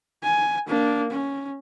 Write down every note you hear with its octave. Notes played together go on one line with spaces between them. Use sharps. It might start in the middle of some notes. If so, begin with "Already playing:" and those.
G#5
A#3 D4
C#4